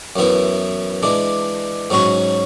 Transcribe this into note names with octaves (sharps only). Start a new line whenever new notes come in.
F#2 E3 B3 E4
E3 G#3 D4
G#2 F#3 C#4 F#4